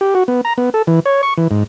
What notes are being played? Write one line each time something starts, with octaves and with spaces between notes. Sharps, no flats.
G4
F#4
B3
A#5
B3
A4
E3
C#5
C#6
E3
G#2